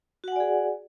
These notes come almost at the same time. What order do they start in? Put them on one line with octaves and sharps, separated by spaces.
F#4 F#5 G#5 D5 G#4